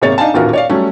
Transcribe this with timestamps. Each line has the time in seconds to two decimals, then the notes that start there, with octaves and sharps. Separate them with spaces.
0.02 G#1 C3 A#3 G#4 C#5 A6
0.18 D4 D#4 F5 G#5 A5
0.33 D#1 A1 D#2 F4 F#4 A#4
0.53 C#5 D5 F5
0.70 F#3 G3 A3 C#4